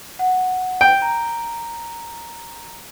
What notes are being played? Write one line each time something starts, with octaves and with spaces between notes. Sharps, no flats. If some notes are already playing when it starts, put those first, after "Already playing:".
F#5
G5
A#5